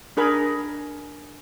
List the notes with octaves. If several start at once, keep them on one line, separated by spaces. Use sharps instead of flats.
D4 G#4 A#4 B5